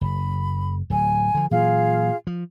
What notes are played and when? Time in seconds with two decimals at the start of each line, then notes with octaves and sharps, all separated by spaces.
0.01 F#1 B5
0.90 D1 F#3 G#5
1.34 D3 F3
1.51 A#2 E3 F#3 F4 G#4 F5
2.27 F3